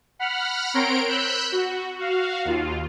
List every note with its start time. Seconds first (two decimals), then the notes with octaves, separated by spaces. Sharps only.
0.19 F#5 B5 F6
0.74 C4 A#4 C#5 A#5 C6 D7
1.08 B5 E6 F#6 G6
1.52 F#4
1.99 F#4 F5
2.45 D#2 F4